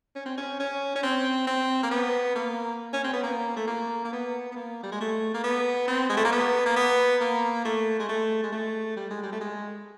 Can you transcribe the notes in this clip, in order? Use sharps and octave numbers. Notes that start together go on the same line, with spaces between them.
C#4
C4
C#4
C#4
C#4
C4
C4
A#3
B3
A#3
C#4
C4
B3
A#3
A3
A#3
A#3
B3
B3
A#3
G3
G#3
A3
A#3
B3
C4
G#3
A3
A#3
B3
A#3
B3
A#3
A3
G#3
A3
G#3
A3
G3
G#3
G3
A3
G#3